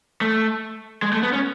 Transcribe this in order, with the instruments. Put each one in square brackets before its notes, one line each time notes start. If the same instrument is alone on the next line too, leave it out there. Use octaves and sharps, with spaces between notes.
[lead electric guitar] A3
G#3
A3
B3
C#4